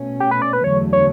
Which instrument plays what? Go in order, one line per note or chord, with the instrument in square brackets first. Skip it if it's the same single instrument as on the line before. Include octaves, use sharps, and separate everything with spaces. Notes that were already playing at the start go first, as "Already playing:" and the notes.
Already playing: [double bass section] B2 A3 C#4
[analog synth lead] G4
B4
D5
B4
[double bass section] E2 D3 F#3 A3 [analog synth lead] C#5
[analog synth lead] C#5